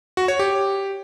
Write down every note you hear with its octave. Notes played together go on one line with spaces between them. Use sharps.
F#4
C#5
G4